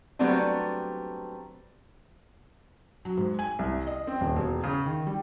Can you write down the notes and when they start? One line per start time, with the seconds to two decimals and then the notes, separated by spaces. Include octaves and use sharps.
0.19 F#3 G3 A3 B3 C4 D4
3.05 F#3
3.17 G#2
3.39 G#5
3.59 C2
3.87 D#5
4.07 C4
4.21 D#1
4.36 E1
4.64 C#3
4.86 D#3
5.07 G3